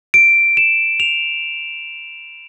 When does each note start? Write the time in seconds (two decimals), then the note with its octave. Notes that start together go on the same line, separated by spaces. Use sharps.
0.14 D7
0.57 E7
1.00 F7